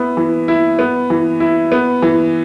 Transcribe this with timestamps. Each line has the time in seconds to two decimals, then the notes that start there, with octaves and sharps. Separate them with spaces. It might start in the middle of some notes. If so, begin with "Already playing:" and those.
Already playing: B3 E4
0.17 E3
0.48 E4
0.79 B3
1.10 E3
1.40 E4
1.72 B3
2.02 E3